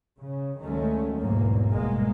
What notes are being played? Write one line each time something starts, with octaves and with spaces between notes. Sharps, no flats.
C#3
D2 D#3 F#3 G#3 A3 C#4
B1 E2 G#2 F#3 A#3
G1 G#2 B2 G#3 A#3